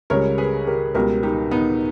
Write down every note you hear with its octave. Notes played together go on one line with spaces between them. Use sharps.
C#2 C#3 G3 A#4 C#5
G#4 B4
G4 A#4
C#2 B2 G3 G4 A#4
D#4 G4
B3 D#4